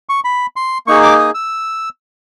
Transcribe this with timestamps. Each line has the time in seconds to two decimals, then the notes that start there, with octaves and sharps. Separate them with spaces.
0.09 C#6
0.25 B5
0.56 C6
0.87 A#3 D#4 G#4 C#6
1.03 D6
1.19 D#6
1.35 E6